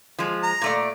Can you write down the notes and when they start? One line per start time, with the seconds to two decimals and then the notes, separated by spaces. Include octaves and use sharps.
0.19 F3 G#3
0.43 A#5
0.62 A#2 A3 D5